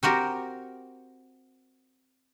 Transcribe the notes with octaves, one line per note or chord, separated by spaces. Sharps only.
C4 F#4 G4 A#4